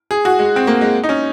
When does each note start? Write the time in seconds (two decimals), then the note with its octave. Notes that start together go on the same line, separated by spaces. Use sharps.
0.11 G#4
0.25 F#4
0.39 G#3
0.56 C4
0.67 A#3
0.81 G#3
1.04 D#4
1.09 C#4